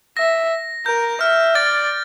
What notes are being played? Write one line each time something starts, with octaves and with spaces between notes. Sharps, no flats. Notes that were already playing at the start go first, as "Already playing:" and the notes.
E5 A#6
A#4 G6
E5 F6
D5 A6